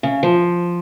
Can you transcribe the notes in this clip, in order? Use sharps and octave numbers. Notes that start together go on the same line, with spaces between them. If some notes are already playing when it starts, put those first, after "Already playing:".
C#3
F3